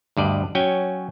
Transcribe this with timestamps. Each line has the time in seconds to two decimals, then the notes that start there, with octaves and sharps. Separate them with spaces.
0.17 D2 G2 D5 D#5
0.55 F#3 C#4 G5 G#5